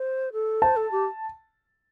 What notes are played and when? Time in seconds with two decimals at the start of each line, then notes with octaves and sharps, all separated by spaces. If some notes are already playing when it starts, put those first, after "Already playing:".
Already playing: C5
0.33 A4
0.62 C5 A5
0.76 A4
0.91 G4